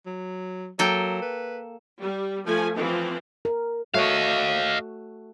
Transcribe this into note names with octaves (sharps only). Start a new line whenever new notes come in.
F#3
F#3 A#3 A4 G5
B4
G3
F3 A3 G#5
E3 F3 C4
A#4
A3 F#4 C#5 D#5 F5